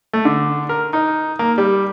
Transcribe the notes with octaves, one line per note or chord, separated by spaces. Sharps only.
A3
D3
A#4
D#4
A#3
G3